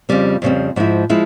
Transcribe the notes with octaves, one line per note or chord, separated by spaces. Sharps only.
F2 C#3 G3 C4
F2 C#3 G3 C4
G#2 F3 G#3 E4
F3 G#3 E4